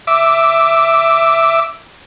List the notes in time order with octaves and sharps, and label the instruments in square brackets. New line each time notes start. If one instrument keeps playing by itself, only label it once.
[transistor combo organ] E5 D6